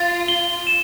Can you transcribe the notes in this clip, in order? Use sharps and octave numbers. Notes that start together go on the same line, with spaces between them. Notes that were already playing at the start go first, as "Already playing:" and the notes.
Already playing: F4 A6
G7
E7